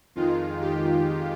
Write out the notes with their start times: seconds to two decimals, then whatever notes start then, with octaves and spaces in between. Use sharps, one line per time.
0.16 F2 D#3 G#3 F4
0.61 G4